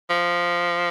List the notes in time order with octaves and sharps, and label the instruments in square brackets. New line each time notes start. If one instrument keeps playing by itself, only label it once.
[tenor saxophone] F3